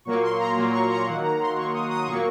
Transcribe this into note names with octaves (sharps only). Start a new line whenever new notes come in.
A#2 F#3 A#3 C#6
C6
A#5
A#2 F#3 A#3
C#6
A#5
D#3 F#3 A#3 F#5
A#5
C6
D#3 F#3 A#3 C#6
D#6
D#6
A#2 F#3 A#3 C#6